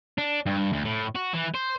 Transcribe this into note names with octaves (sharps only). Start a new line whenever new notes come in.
D4
G2
D2
A2
F#4
E3
C5